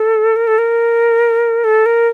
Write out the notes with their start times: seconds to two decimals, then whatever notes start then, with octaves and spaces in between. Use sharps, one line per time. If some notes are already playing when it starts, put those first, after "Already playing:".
Already playing: A4
0.36 A#4
0.47 A4
0.58 A#4
1.64 A4
1.86 A#4